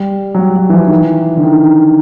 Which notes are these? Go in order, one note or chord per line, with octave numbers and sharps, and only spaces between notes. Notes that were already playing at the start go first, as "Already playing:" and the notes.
Already playing: G3
F#3
G3
F#3
E3
F3
D#3
E3
D3
D#3